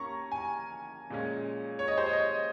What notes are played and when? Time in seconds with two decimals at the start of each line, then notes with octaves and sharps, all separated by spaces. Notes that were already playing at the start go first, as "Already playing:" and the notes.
Already playing: A#3 C#4 A#5 C#6
0.32 G#5
1.10 A#2 G#3 C#4
1.79 C#5
1.88 D#5
1.98 C5
2.06 C#5
2.13 D#5